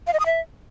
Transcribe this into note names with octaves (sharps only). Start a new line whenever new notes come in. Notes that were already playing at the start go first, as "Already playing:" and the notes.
F5
D#5
D#6
E5